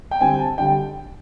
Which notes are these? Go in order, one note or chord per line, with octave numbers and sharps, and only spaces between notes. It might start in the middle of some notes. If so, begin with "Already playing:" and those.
G5
D3 G3 C4 G#5
A5
D3 G3 G5